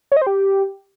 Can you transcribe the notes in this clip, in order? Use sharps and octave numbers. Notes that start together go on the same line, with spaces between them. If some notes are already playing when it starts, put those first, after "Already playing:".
C#5
D#5
C5
G4